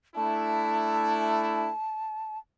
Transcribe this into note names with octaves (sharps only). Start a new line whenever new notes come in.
A3 D4 E4 A5